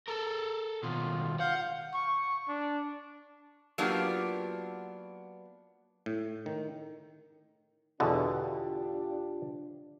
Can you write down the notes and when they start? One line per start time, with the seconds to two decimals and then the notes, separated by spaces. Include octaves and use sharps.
0.08 A4 A#4
0.83 D#2 B2 F4
1.40 F5 F#5 G6
1.94 C#6
2.48 D4
3.78 F#3 A#3 B3 D4 F4 G4
6.06 A2
6.46 D#3
8.00 E2 B2 D3 D4 F4 G4